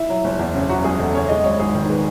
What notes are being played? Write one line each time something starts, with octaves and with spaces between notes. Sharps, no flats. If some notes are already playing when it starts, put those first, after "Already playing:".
Already playing: E4
F#3
F#1
E2
C#3
F#3 F#4
F#1 G#4
E2 A4
C#3 C#5
G#3 D#5
G#1 C#5
G#2 G#4
D#3
G#3 B4